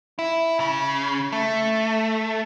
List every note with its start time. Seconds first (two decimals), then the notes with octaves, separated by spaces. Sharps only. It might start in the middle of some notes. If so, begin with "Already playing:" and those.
0.19 E4
0.60 C#3
1.32 A3